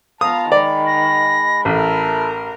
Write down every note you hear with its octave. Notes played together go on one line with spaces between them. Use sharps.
B3 F4 F5 A5 A#5 D#6
D#3 G#3 D5 B5
A#6
A1 E4 A4 A#4 B5